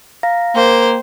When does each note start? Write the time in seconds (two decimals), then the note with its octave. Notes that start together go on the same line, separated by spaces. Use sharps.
0.23 F5 A#5 A#6
0.56 A#3 C5 G5